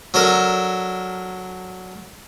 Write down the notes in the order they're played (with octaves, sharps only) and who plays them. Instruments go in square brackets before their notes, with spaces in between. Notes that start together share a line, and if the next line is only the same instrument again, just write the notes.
[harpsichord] F#3 D4 A4 A#4